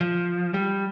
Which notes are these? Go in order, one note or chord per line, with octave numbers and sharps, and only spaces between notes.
F3
G3